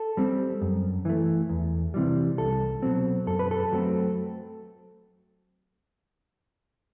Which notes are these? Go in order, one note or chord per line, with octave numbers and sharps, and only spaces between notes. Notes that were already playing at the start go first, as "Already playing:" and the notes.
Already playing: A4
G3 C4
F#2
E3 A3
E2
C3 E3 G3
C2 A4
B2 F#3 C4
F#2 A4
B4
A4
F#3 A3 C4